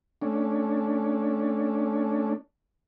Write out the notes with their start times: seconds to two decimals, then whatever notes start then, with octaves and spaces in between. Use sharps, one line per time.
0.22 A3 C#4 D4